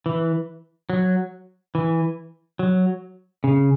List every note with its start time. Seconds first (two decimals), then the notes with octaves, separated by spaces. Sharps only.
0.06 E3
0.90 F#3
1.75 E3
2.59 F#3
3.44 C#3